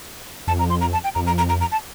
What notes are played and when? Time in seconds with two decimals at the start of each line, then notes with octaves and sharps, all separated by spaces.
0.47 F2 A5
0.59 A#5
0.70 C6
0.81 A#5
0.93 A5
1.04 G5
1.15 F2 A#5
1.27 A#5
1.38 A#5
1.49 A#5
1.61 A#5
1.72 A5